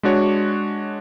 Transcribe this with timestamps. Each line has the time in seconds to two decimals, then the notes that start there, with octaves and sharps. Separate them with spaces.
0.03 G#3 D4 F#4 C#5